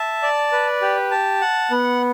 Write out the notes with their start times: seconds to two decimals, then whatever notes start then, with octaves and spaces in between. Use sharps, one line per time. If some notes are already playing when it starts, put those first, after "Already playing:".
Already playing: E5 A5
0.22 D5
0.52 B4
0.82 G4
1.11 A5
1.41 F#5
1.71 B3